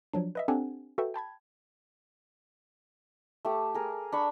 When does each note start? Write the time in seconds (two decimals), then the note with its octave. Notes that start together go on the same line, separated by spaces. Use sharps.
0.13 F3 F#3 D4
0.35 B4 D#5 E5
0.48 C4 D4 G4 A4 F#5 G#5
0.98 F#4 A4 B4 E5 G5
1.14 G5 A5 B5 G#6
3.45 A3 G4
3.74 G#4 A#4
4.12 D4 B5 C#6